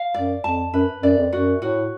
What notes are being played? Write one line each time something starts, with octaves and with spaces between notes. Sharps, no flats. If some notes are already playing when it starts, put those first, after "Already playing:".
Already playing: F5
F#2 D5
F2 A5
F#2 B4
F#2 D5
F2
F#2 F#4
A2 F#4